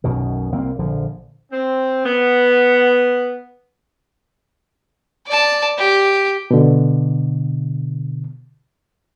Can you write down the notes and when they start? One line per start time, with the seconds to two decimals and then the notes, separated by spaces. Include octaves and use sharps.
0.04 B1 F#2 B2 D#3
0.52 C2 A#3 C4
0.79 A#1 D3 F3
1.51 C4
2.05 B3
5.27 D5 A5
5.78 G4
6.51 B2 D3